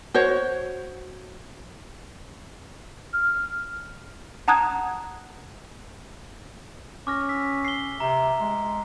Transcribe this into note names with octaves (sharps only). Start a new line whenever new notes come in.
F#4 C5 C#5
F6
F#5 A5 A#5 D#6 F#6 G#6
C#4 D6 F6 A#6
E6 B6
C7 G7
C3 A#5
G#3